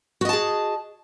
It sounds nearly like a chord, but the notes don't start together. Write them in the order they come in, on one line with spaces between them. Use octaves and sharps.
F#4 D#5 A5 G#4